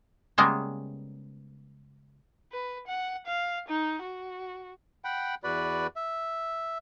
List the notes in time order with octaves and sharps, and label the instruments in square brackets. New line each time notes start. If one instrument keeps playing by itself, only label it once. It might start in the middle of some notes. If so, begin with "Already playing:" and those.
[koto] C#3 G3 G#3 A#3 B3
[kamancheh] B4
F#5
F5
D#4
F#4
[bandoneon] F#5 G5 B5
E2 F#4 B4 D5 B5
E5